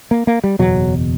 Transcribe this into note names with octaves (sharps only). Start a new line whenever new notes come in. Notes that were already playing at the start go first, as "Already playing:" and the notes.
A#3
A#3
G3
F#1 E2 B2 F#3